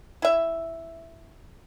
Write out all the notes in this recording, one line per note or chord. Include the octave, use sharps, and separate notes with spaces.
E4 E5